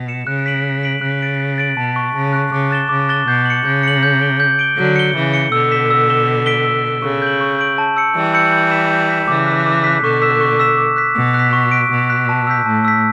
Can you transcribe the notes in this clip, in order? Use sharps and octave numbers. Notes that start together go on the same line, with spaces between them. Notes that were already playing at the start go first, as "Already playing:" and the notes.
Already playing: B2
C#7 E7
C#3 F#6
B6 D7 F#7
F#6
B6 D7 F#7
C#3 F#6
A6 D7 F#7
F#6
A6 D7 F#7
B2 A5
C#6 F#6
C#3 A5
C#6 F#6
C#3 D6
F#6 A6 E7 G7
C#3 D6
F#6 A6 E7 G7
B2 G6
C#7 F#7
C#3 G6
C#7 F#7
G6
D7 G7
G6
D7 G7
D3 F#3 G6
C#7 G7
C#3 E3 G6
C#7 G7
B2 D3 E6
B6 E7 G7
E6
B6 E7 G7
E6
B6 D7 G7
E6
B6 D7 G7
C#3 C#6
G6 D7 F#7
C#6
G6 D7 F#7
A5
E6 G6 C#7
E3 G3 A5
E6 G6 C#7
G6
B6 E7
G6
B6 E7
C#3 E3 D6
F#6 B6
D6
F#6 B6
B2 D3 C#6
E6 B6 E7
C#6
E6 B6 E7
D6
F#6 B6
B2 D6
F#6
B6
C#6
F#6 B6 D7
B2 C#6
F#6 B6 D7
A5
E6 G6 B6
A2 A5
E6 G6 B6